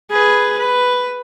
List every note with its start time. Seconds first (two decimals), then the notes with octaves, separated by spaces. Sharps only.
0.11 G#4 B4
0.58 B4